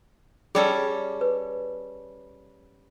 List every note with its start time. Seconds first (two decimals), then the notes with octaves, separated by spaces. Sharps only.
0.55 G3 C#4 G#4 A4
1.21 B4